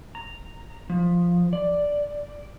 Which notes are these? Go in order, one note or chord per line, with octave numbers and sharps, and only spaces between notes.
A#5
F3
D5